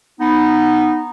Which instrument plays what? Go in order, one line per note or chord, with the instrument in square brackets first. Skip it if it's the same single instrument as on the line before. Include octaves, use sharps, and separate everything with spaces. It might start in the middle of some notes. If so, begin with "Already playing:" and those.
[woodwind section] B3 D#4